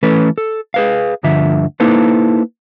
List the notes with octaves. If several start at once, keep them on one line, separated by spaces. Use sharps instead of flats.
E3 A3 C#4 A4 B4
A4
G#4 B4 F5
D2 G2 D3 F3 E5
A#3 D#4 E4 A4 B4 C5